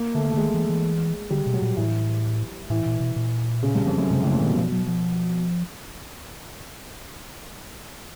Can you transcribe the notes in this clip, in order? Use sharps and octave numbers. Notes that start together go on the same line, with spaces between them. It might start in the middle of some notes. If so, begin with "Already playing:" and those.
Already playing: A#3
D3 A3
A#3
A3
D3
D#3 G#3
E3
E3
D3 G3
B2
F#3
A#2
A2 E3
A2 E3
A#2
B2
A#2
C#3
G2
F2
F#2
G#2 C3
A2 C#3
A#2
B2 D#3
F3
F#3
F3